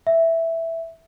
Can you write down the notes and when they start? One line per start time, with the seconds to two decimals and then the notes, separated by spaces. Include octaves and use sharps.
0.07 E5